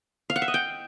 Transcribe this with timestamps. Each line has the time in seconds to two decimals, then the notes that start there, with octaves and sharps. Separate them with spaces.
0.30 F5
0.36 F#5
0.42 E5
0.48 D#5
0.54 G5